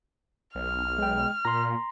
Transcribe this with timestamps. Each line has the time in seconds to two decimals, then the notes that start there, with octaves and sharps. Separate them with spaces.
0.55 B1 F6
0.99 G#3 G5
1.45 A#2 A#5 C6